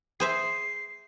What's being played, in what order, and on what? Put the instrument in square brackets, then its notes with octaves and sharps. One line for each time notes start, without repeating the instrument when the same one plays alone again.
[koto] G#4 C5 E5 [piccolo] C7